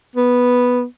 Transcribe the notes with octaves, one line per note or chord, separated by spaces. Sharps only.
B3